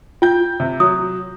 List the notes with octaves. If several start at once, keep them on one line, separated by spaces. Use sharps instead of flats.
F4 G5 G6
C3
F#3 D#6